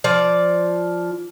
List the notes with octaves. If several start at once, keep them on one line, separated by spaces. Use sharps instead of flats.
F3 D5